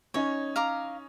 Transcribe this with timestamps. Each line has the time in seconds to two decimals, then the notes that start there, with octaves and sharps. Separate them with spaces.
0.14 C#4 D#4 C#5
0.56 F5 A#5 D6